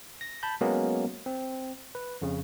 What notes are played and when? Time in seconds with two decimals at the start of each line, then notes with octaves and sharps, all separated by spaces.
0.21 A#6
0.43 A5 B5 G6
0.61 F#3 G#3 A#3 B3 C#4
1.26 C4
1.95 B4
2.22 F2 C#3